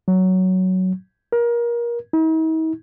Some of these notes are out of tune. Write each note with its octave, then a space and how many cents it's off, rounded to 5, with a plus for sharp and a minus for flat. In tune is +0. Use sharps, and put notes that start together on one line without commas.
F#3 +10
A#4 +25
D#4 +45